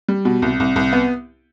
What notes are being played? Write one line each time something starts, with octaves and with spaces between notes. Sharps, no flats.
G3
B2
C2
C2
C2
B3